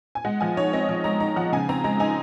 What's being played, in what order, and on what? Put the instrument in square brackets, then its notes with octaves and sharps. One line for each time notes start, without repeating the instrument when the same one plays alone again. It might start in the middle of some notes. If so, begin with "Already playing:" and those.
[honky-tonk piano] G#5
G#3 F#5
F3 G#5
D#4 C#5
C4 D#5
F3 D#5
G#3 A#5
D#4 A#5
F3 F#5
C#3 G#5
C4 A#5
G#3 A#5
D#4 G#5